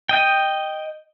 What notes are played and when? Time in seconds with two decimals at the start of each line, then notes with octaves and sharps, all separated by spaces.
0.09 D#5 G5